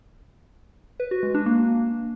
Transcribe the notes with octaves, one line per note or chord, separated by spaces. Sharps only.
B4
F#4
G#3
D4
A#3